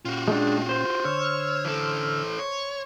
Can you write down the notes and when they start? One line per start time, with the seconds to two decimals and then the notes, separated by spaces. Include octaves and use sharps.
0.05 A#2 C#4 F4 F#4 G5
0.28 G#3 D4
0.69 C5
1.05 D3 C#5 E6 F6
1.65 E3 A4
2.39 C#5